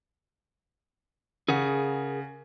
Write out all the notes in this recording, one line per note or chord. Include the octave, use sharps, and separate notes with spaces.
C#3 G#4 A#4 F#5